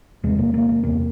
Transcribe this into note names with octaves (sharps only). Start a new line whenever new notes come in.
E2 C3 G#3
A#3
A#3
A#3
E2 C3 A#3